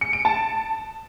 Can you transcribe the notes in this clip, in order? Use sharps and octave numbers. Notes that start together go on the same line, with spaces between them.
C#7
D7
A5